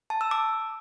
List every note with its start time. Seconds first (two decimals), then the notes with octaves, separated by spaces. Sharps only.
0.10 A5
0.21 E6
0.31 D6